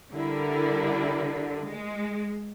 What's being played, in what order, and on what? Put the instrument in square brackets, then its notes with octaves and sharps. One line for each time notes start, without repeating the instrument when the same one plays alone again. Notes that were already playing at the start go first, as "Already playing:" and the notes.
[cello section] D3 [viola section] G3 E4 A#4
[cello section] G#3